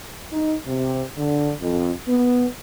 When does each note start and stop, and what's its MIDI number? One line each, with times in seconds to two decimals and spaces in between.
0.32 0.54 63
0.67 1.03 48
1.18 1.52 50
1.60 1.90 41
2.08 2.46 59